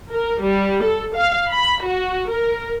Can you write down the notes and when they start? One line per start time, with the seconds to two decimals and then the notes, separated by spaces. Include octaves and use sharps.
0.12 A#4
0.42 G3
0.84 A4
1.16 F5
1.51 B5
1.85 F#4
2.32 A#4